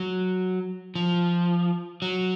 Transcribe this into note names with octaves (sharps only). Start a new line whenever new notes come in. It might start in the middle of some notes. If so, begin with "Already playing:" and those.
Already playing: F#3
F3
F#3